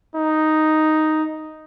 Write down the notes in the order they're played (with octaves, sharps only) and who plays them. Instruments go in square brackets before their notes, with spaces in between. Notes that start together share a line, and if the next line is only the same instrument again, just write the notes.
[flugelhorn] D#4